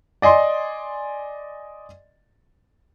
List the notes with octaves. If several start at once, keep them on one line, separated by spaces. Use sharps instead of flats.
D5 D#5 G#5 C6